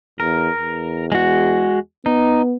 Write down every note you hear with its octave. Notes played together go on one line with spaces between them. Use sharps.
E2 A#4
E2
G#3 F#4
B3 D#4